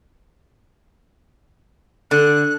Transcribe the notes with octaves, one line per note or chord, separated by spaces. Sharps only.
D3 A4 F#6